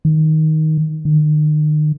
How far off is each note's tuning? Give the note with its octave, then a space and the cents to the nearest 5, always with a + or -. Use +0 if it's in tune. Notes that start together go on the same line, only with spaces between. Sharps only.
D#3 +10
D#3 -40